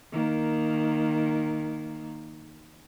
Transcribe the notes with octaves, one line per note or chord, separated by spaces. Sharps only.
D#3 A#3